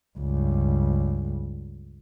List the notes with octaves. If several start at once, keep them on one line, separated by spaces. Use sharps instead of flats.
C#2 G2